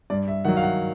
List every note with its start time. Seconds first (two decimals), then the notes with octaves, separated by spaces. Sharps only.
0.10 G2 D5
0.28 E5
0.45 D#3 F#3 F#5
0.57 F5
0.63 F#5